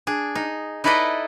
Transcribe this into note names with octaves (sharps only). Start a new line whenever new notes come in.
D4 G#4
D#4
D#4 E4 A4 B4 D5 D#5